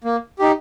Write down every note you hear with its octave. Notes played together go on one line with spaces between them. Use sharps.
A#3
D#4 G4